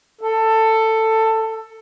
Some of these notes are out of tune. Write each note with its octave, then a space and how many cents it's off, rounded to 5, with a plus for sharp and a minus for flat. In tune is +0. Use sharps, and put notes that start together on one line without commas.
A4 +15